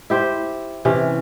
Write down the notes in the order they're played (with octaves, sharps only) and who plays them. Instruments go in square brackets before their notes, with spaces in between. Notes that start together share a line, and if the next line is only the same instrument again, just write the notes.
[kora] E4 G4 C5
C3 E3 C#4